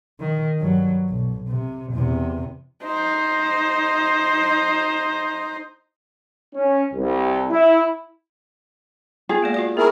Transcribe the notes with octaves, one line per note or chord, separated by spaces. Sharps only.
D#3
G2 F#3
B1
C3
E2 C3
D#4 C5
C#4
C2
E4
B3 F4 G#4
G#3 A#3 D5
F4 F#4 D5
B3 E4 G#4 A#4 C#6